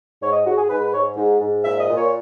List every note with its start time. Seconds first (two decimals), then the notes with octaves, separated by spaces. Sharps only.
0.21 G#2 C#5
0.33 D#5
0.45 G#2 F#4
0.58 G#4
0.70 G#2 B4
0.82 B4
0.94 G#2 C#5
1.17 G#2
1.41 G#2
1.64 A#2 E5
1.80 D#5
1.89 A#2
1.97 C#5